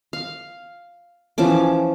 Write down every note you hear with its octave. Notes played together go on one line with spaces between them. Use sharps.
F5
E3 F3 C#4 D6